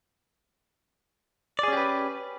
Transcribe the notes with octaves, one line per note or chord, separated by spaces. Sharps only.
C#4 G4 G#4 B4 D5